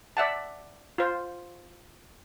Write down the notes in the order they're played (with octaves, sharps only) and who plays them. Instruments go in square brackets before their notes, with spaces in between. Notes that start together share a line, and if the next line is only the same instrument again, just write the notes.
[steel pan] D5 E5 F#5 A5
F4 C5